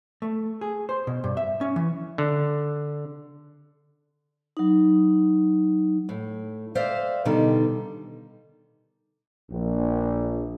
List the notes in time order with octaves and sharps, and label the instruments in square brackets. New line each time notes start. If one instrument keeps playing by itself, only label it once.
[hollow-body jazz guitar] A3
G#4
C5
B2
G2
E5
C#4
E3
[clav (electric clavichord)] D3
[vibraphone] F#3 D#4
[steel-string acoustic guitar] A2
C5 D5 E5 F5
B2 D3 D#3 G3
[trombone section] A#1